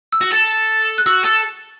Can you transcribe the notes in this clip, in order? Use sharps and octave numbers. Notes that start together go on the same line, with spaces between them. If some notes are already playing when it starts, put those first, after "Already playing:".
E6
F#4
A4
F#6
F#4 E6
A4 E6